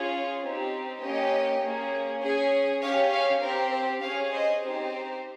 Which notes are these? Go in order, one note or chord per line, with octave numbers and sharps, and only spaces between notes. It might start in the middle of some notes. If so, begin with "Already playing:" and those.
Already playing: C#4 F4 G#4
C4 D#4 G4
A#3 C#4 G4 D#5 G5
A#3 C#4 G#4
C#4 G#4
C#4 G4 C#5 F5
C#5 F5
C4 G4 A#4
C5
C#4 G#4 C#5 F5
C5 D#5
C4 D#4 G4 C5